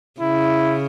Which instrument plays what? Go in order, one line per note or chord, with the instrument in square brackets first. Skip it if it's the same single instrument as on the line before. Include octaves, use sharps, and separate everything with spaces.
[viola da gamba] C#3 [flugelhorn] E4